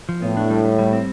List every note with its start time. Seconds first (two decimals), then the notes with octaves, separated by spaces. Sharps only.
0.09 F3
0.22 A2 B3
0.37 D4
0.50 G3
0.64 G3
0.79 G3
0.93 C4